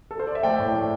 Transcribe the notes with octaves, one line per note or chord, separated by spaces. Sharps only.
A4
C5
D5
E5
A3 D5 G5
A2
A3